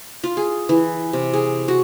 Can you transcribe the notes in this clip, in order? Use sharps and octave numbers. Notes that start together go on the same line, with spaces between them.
F4
G#4
E3
C3
G#4
F#4